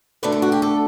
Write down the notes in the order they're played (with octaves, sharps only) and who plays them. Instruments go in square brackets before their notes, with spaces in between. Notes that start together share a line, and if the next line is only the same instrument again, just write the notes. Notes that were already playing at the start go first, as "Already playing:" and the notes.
[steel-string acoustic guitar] D2 D3 A3 D4 B4
A4
F#4
G4
A4